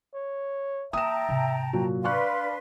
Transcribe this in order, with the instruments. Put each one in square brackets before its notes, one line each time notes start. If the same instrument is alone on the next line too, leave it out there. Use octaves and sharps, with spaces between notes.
[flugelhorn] C#5
[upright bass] E3 A#3 [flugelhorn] E5 [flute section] G5 A5 A#5 [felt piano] D#6 E7
[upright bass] G#2 C3
[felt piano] A#2 F#3 F#4
[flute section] D4 B4 C6 [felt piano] D5 C#6 F#6 [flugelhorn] F5